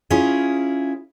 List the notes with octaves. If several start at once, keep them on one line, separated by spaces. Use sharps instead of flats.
C#4 E4 F4 G#4